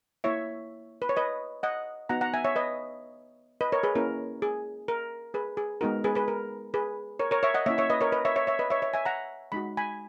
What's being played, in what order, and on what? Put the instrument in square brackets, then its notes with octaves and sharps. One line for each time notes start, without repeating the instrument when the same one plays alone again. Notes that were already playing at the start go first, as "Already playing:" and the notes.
[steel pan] A#3 E4 C#5 E5
B4
C#5
B4 D#5
D#5 F#5
B3 D#4 F#4 F#5 A#5
F#5 A#5
E5 G#5
C#5 E5
B4 D#5
B4 D#5
A#4 C#5
G#4 B4
A#3 C#4 E4 A#4
G#4
A#4
G#4 B4
G#4
G#3 B3 D#4 F#4 A#4
G#4 B4
G#4 B4
A#4
G#4 B4
A#4 C#5
A#4 C#5
C#5 E5
D#5 F#5
A#3 C#4 E4 C#5 E5
C#5 E5
B4 D#5
A#4 C#5
B4 D#5
C#5 E5
C#5 E5
C#5 E5
B4 D#5
C#5 E5
C#5 E5
E5 G#5
F#5 A#5
G#3 D#4 F#4 B5
G#5 B5